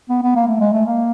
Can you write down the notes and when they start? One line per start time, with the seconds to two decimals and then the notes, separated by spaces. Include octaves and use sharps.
0.09 B3
0.23 B3
0.36 A#3
0.47 A3
0.60 G#3
0.73 A3
0.86 A#3